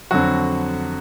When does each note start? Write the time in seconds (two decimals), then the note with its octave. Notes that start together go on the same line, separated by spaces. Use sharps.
0.11 F2 D3 F#3 F#4